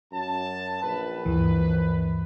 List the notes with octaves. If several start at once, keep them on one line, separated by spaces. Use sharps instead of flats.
F#2 A5
A#1 B4
D2 G2 E3